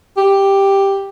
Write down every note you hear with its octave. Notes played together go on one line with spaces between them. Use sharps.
G4